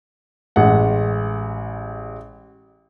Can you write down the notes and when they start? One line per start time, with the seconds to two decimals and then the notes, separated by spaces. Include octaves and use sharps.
0.56 A1 G#3 F#5